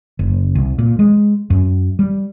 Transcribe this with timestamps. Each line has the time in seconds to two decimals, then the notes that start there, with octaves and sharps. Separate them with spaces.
0.19 F#1
0.55 C2
0.79 A#2
0.99 G#3
1.50 F#2
1.99 G3